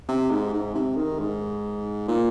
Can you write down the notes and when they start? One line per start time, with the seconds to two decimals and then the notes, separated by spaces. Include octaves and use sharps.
0.08 C3
0.31 G#2
0.53 G#2
0.75 C3
0.97 D#3
1.19 G#2
2.08 A#2